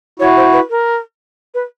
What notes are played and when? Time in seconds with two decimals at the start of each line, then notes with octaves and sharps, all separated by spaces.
0.20 E4 F#4 C#5
0.37 C5
0.53 B4
0.70 A#4
1.54 B4